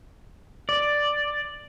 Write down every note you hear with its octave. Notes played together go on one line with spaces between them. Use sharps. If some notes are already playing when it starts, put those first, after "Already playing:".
D5